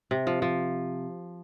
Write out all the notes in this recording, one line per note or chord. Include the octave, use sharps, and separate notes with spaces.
C3
F3
F3